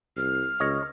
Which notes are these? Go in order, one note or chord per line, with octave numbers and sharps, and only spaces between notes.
C2 F6
C#2 C#5 D#5